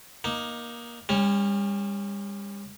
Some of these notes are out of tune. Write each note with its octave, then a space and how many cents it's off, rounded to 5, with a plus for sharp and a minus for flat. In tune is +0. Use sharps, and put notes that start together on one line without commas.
A#3 +20 D#4 +0
G3 +40 C#4 +0